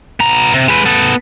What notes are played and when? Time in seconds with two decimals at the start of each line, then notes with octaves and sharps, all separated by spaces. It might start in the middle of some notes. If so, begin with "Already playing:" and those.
0.20 B3 A#5
0.54 C3
0.68 G#3 B4
0.86 B3 A4